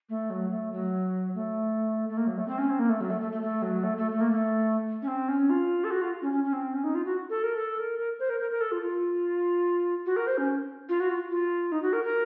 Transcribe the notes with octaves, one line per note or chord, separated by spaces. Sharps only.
A3
F#3
A3
F#3
A3
A3
A#3
F#3
A3
C4
C#4
C4
A#3
A3
F#3
A3
A3
A3
A3
F#3
A3
A3
A3
A#3
A3
C#4
C4
C#4
F4
A4
F#4
F4
C#4
C#4
C#4
C4
C#4
D#4
F4
F#4
A4
A#4
A4
A#4
A#4
C5
A#4
A#4
A#4
A4
F4
F4
F#4
A#4
C5
C#4
F4
F#4
F4
F4
D#4
F#4
A#4
A#4